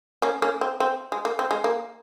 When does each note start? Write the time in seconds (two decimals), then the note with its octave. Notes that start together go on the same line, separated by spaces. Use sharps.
0.22 A#3 C#4
0.42 A#3 C#4
0.61 C4
0.80 C4
1.12 G#3
1.25 A#3
1.39 C4
1.51 G#3
1.64 A#3